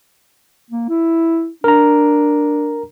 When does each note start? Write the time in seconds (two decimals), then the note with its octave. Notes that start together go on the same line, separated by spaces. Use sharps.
0.71 A#3
0.89 E4
1.64 D4 A#4 A#5